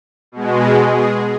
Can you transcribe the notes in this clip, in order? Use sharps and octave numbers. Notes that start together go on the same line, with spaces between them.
B2 G#3
G#4